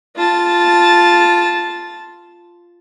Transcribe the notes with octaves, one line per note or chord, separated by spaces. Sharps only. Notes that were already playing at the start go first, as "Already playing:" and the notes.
F4 A5